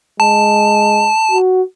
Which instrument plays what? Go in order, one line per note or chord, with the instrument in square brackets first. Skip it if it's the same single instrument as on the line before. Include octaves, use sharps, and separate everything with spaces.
[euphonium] G#3 [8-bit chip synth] A5
[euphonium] F#4